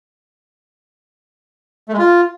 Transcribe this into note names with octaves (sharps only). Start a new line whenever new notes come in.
A3
G#3
F4